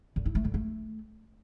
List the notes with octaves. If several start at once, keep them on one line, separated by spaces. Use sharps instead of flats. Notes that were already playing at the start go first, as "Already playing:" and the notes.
D3
E4
A3
D3
A3